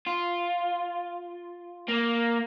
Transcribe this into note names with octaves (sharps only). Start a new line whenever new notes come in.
F4
A#3